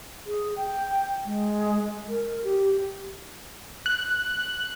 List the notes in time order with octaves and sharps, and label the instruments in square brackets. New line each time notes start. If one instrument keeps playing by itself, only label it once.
[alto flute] G#4
G5
G#3
A#4
G4
[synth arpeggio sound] F#6